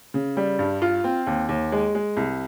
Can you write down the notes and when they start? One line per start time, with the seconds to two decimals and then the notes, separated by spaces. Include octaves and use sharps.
0.14 C#3
0.37 G3
0.59 G2
0.82 F4
1.04 C4
1.27 D#2
1.49 D#2
1.72 G#3
1.95 G#3
2.17 C2